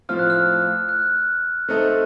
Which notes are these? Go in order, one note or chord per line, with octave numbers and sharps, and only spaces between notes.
A2 F3 C4 F4 F6
F#6
F6
F#6
A3 C4 D#4 A4